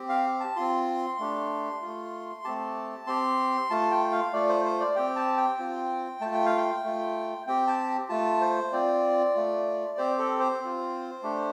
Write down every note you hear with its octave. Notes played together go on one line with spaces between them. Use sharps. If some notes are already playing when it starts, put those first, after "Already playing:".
Already playing: C4 G4
F5
A5
C4 F4 C6
A3 D4 G4
A3 F4
A3 C4 G4 A5
C4 G4 C6
A3 F4 A5
G5
F5
A3 F4 D5
C5
C5
D5
C4 G4 G5
A5
G5
C4 F4
A3 F4 A5
G5
F5
G5
A3 F4
C4 G4 G5
A5
A3 F4 A5
C5
C4 F4 D5
A3 F4
C4 G4 C5
A4
C5
C4 F4
A3 D4 G4